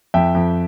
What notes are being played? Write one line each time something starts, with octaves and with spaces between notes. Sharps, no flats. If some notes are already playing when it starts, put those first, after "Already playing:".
F2 E5 G5
F2